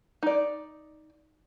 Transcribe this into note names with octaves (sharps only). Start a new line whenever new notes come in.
D#4 D5